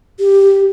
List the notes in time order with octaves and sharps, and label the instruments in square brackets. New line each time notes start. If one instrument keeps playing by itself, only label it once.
[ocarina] G4